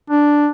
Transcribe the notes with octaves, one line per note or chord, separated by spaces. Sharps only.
D4